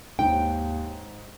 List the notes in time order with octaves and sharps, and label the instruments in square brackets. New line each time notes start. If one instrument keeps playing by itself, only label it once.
[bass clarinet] D#2 [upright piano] G#2 [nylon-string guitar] G5